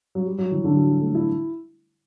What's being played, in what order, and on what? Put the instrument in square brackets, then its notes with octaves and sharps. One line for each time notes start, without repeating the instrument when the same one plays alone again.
[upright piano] F#3
G3
F#3
E3
D3
F#3
G3
A3
E4